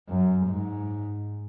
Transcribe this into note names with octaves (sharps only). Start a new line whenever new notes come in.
F#2
G#2